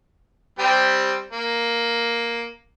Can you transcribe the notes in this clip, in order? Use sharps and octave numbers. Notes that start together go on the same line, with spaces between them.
G3 C4 G4
A#3